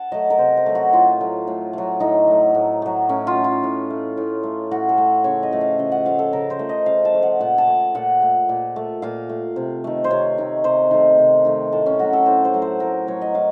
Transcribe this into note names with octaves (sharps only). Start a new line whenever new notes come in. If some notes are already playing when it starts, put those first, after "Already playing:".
Already playing: F#5 A5
F#3 A3 D#5
A#4
C3 C5
C5
F#3 A3
F#4
A2 F4
F#3 A3
A2
F#3 A3
A2 D#4
F#3 A3
A2
F#3 A3
A2 C#4
F4
A3
F4
A2
A3
A2
A3
A2 F#4
A4
A3
C#3 C#5
D#5
F3 A3
F5
C#3 D#5
F#5
F3 A3 F5
A4
C#3 A#4
C5
F3 A3
D#5
C#3 F5
A5
F3 A3
F#5
A#2 F#5
A5
A3
A#2 F#5
A3
A#2
A3
A#2 F5
A3
C3
D#3 A3
C5
C3 C#5
D#3 A3
C3 C5
D#3 A3
C3
D#3 A3
A2 A4
C#4
F#3 A3 F#4
A4
A2 C5
C5
F#3 A3
C5
A2 A#4
F#3 A3 C#5
D#5
A2 F5